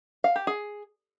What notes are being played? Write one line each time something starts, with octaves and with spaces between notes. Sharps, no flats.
F5
G4
G#4